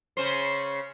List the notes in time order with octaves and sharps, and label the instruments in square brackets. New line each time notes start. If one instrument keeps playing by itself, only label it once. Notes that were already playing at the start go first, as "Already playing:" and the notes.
[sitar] C#3 C#4 C5